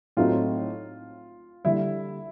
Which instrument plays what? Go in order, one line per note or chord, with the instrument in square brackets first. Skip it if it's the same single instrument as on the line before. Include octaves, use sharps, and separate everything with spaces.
[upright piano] A2 F#3 A3 C4 D#4 [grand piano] F4
[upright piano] D3 G3 [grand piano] E4